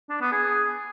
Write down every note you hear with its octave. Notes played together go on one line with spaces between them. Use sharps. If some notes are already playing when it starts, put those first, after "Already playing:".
D4
B3
G#4